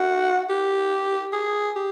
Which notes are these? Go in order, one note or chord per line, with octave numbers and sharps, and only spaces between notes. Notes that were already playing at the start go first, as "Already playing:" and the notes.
Already playing: F#4
G4
G#4
G4